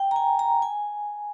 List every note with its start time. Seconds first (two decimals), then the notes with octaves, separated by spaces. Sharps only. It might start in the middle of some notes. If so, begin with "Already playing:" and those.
Already playing: G5
0.11 A#5
0.16 G#5
0.39 A#5
0.62 G#5